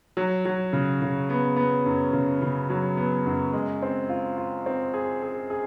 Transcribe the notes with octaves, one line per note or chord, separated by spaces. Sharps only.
F#3
F#3
C#3
C#3
B3
B3
F#2
C#3
C#3
F#3
B3
F#2
G#3
C4
F4
F4
C4
G#4
G#4
G#4